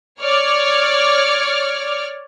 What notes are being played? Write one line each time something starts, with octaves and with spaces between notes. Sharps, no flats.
C#5 D5 F6